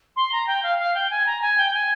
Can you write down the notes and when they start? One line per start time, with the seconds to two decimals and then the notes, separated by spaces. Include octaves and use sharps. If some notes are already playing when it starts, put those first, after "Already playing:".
0.16 C6
0.32 A#5
0.47 G5
0.63 F5
0.79 F5
0.94 G5
1.10 G#5
1.26 A#5
1.41 G#5
1.58 G5
1.74 G#5